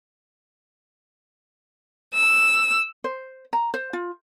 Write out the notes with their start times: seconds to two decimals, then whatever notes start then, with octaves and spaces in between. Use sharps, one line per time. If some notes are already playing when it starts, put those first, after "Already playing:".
2.14 E6
3.04 C5
3.53 A#5
3.74 C5
3.93 F4